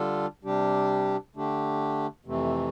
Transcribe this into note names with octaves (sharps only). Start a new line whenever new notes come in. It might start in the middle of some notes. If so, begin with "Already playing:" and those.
Already playing: D3 G3 D4 F4 A4
C3 G3 D4 G4
D3 A3 D4 G4
F2 C3 E3 A3